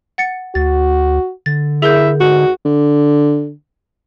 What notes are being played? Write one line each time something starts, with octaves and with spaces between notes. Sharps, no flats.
F#5 A6 C#7
D2 F#4 A6
D3 A6
E4 G#4 A#4 E5 G6
G#2 F#4
D3